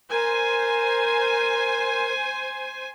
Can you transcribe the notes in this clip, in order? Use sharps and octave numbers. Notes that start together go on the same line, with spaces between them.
A#4 C5 G#5